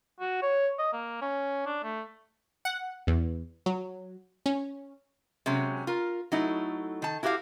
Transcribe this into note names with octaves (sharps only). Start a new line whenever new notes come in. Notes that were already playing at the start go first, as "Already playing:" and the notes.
F#4
C#5
D#5
A#3
C#4
D4
A3
F#5
E2
F#3
C#4
C3 F#3 G#3 C#4
F4 A#4
F#3 A3 D#4 E4
D#3 A5
E4 F#4 G4 B4 F5